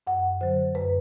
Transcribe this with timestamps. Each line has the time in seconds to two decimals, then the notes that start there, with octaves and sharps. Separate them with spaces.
0.07 F#2 F#5
0.41 D3 F#3 C5
0.75 F#2 B4